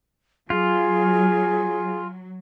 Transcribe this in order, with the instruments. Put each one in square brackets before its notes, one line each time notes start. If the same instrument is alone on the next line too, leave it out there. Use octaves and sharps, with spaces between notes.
[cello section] F#3 [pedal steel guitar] F4 [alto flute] G#4 [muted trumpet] G#5